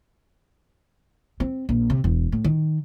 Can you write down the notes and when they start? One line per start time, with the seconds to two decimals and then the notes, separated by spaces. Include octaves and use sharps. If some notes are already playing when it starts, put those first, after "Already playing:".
1.40 C4
1.69 A#1
1.90 C3
2.04 E1
2.32 A2
2.44 D#3